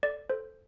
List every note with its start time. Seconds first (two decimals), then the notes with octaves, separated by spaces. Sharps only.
0.03 A4 D5
0.30 A4 C5